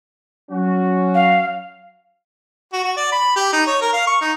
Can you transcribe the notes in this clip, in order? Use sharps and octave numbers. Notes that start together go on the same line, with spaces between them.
F#3 C#4 F#4
F5
F#4
F#4
D5
B5
G4
D#4
C#5
A#4
F5
C#6
D#4